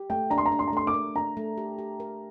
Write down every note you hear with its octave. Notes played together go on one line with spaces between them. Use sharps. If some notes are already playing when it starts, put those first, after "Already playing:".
Already playing: G4
A3 G5
D4 A#5
C6
A#5
D4
C6
A#5
A3 C6
D6
A#4
D4 A#5
A3
G4
G4
A#4